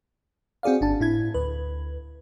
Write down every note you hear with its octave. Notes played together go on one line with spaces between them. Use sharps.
C4 F#4 G#4 D5 F5
G1 D4 A5
A2 E4 G#6
D2 B4